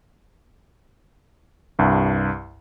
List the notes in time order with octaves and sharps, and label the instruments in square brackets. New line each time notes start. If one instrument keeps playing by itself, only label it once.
[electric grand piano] C2 G2